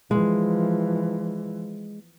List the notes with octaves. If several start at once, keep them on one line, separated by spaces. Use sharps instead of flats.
E3 F3 G#3